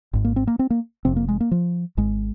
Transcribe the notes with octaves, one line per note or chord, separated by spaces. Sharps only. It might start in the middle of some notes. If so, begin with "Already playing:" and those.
G#1 G#2
A#3
C4
A#3
C4
A#3
F1 F2 C3 C4
A#3
G#3
A#3
F3
G#1 G#2 G#3